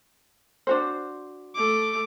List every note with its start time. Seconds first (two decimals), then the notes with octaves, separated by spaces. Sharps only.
0.67 D4 F#4 C5
1.55 A3 D6